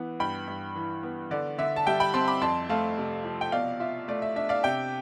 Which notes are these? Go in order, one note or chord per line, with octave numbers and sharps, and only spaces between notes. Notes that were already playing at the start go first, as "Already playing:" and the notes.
Already playing: E3 B3
G2 G5 B5
G2
E3
B3
D3 D5
D3 E5
A5
G3 E5 G5
G5 B5
C4 A5 C6
B5 D6
F2 A5 C6
A3 F5 A5
C3
F3
G5
B2 D5 F5
F4 E5
A3 D5
E5
D4 E5
D5 F5
C3 E5 G5